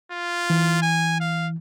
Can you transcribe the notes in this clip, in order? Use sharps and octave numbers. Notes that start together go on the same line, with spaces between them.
F4
E3
G#5
F5